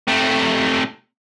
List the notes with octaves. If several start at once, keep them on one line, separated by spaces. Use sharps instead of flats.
C3 A3